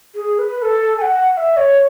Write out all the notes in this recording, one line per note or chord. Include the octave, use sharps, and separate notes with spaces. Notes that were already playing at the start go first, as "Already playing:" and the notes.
G#4
B4
A4
G#5
F#5
F#5
E5
C#5